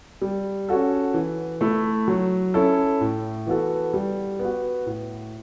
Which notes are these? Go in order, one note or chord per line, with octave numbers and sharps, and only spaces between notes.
G3
C#4 F#4 A4
E3
A3 E4
F#3
C#4 E4 A4
A2
E3 B3 F#4 A4
G3
B3
F#4
A2